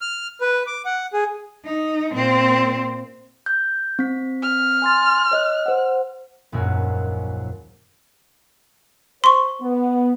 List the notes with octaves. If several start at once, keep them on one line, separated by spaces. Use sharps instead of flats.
F6
B4
D6
F#5
G#4
D#4
A#2 C4
G6
C4 B6
F6
G#5 C6 A6
C#5 D#5 F#6
C5 F#5
D#1 A#1 F#2 G#3 F#4 A#4
C5 C6 C#6
B3